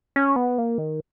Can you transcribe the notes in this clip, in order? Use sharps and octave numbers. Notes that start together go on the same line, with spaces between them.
C#4
B3
A#3
D#3